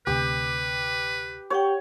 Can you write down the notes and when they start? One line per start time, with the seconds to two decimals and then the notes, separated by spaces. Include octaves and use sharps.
0.07 D2 C3 G4 B4
1.50 G4 C#5 F#5 G5